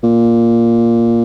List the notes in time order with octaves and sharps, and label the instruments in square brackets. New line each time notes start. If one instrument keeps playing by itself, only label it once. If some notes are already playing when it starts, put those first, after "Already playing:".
[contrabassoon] A#2